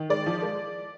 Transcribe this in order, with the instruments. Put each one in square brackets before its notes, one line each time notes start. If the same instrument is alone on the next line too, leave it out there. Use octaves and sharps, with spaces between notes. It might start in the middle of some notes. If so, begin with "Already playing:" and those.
Already playing: [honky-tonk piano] D#3
G#3 D5
F3
G#3